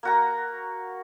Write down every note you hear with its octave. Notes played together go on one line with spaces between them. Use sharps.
A#3 F#4 A#5